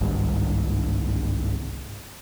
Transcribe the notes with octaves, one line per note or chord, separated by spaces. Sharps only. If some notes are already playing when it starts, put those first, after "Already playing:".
G1 C2 G#2 D#3